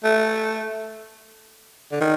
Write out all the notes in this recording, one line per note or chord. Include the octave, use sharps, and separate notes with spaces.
A3
D3
D#3